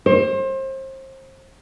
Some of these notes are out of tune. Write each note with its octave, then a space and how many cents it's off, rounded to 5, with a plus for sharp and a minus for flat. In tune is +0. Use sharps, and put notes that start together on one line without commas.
C5 +30